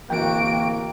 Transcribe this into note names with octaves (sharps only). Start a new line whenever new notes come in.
D1 E3 A#3 F#4 G5 D7